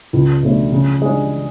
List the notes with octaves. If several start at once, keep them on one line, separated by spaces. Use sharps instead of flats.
C#2
B2 A3 D4
C#3
G#3 D4